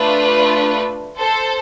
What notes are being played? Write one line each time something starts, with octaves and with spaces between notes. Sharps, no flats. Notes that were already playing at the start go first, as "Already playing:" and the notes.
Already playing: A3 D4 F4 B4
A4 C5